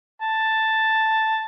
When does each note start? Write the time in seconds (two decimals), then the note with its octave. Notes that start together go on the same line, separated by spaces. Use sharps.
0.22 A5